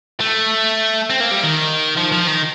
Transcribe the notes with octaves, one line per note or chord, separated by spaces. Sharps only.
A3
C4
A#3
G3
D#3
F3
F3
D#3